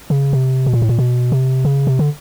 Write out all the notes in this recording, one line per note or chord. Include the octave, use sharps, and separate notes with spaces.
C#3
C3
B2
A#2
A2
A#2
B2
C3
C#3
C3
D3